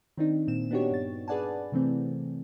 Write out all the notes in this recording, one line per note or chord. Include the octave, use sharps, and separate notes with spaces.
D#3 C4 D4 D#4
A#2 C4 E7
B3 D4 D#4 F#4 G4 C#5
G2 A6
G#4 B4 D5 F#5 G#5 A5
C3 E3 A3 C4